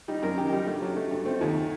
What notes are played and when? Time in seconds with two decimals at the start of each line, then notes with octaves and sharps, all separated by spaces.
0.08 G3 D#4
0.23 F#2 A#4
0.38 D#3 G4
0.52 G3 D#4
0.67 A3 D4
0.82 F#3
0.96 A3
1.11 G2
1.25 A3 C4
1.41 D#2